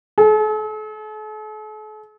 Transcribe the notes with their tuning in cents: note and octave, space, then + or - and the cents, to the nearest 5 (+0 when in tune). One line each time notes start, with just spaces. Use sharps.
A4 -45